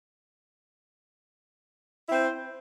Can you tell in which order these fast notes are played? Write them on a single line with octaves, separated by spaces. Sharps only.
E4 C4 C5